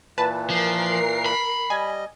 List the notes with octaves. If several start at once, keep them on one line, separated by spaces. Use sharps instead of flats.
A#2 E3 B4 A5
F3 A#4 C7
B5
G3 D#5 G#5